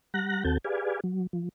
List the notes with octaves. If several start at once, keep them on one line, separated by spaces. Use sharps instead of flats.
G3 F#5 A#5 F#6 A#6
D#2 C4 F#4 A4 A5 G6
G4 G#4 B4 D5 F5 G#5
F#3
F3